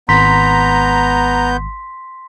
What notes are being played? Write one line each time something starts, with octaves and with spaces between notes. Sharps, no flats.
G#1 B3 A#5 C6 G6 B6